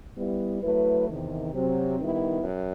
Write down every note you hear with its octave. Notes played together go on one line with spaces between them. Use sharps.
G3 B3 E4
F#3 A3 E4 B4
E2 C3 D#3
C3 F#3 C4
D#3 G3 B3 E4
F#2